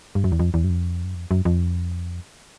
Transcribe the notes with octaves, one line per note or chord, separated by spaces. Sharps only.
G2
F#2
E2
F2
E2
F#2
F2
F#2
F2
F#2
F2